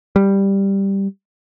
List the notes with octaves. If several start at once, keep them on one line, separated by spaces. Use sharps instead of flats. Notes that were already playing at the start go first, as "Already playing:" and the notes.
G3